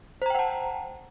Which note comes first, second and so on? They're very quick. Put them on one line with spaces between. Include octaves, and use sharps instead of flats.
C5 A#5 G5 F#5 A5